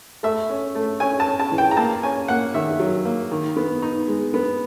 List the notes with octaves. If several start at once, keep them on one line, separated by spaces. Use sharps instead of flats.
A3 E5
C#4
A3
C#4 G#5
A5
C#4
A5
E3
G5
A#5
A#3 A5
C#4 G#5
A#3 F#5
D#3 E5
F#3
A#3
D#3
B3
D#4
G#3
B3